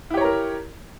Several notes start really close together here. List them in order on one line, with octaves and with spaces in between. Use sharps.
E4 G4 C#5 A#5 A#4